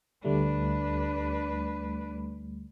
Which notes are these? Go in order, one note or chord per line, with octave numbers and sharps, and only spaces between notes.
D2 G3 A3 D4 B4